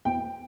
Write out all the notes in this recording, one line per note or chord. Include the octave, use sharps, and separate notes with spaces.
E2 G5